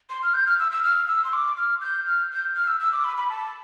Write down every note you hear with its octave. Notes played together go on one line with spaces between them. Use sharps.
C6
F6
G6
F6
E6
E6
F6
E6
C6
D6
F6
G6
F6
G6
F6
E6
E6
D6
B5
B5
A5